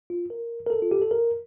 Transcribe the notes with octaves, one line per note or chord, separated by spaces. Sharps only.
F4
A#4
A#4
A4
F4
G4
A4
A#4